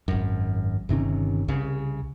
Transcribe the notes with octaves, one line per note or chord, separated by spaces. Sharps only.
G#1 F#2
G1 C3 D#3 C#4
C2 C#3